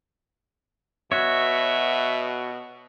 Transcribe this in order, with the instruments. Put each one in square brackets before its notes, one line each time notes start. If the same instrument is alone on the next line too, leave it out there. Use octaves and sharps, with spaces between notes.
[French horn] B2 [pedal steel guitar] F#4 C#5 [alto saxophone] E5